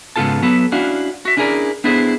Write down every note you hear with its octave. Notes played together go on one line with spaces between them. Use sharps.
G#2 C#3 B3 F4 A4 A5
F#3 B3 A4 B4
C#4 D4 E4 F#4 F5
F#4 E5
C#4 D4 E4 G#4 A#4 D5
B3 D4 E4 G#4 A4 C5